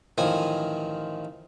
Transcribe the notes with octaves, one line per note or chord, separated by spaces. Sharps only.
A1 D#3 F3 G#5 D#6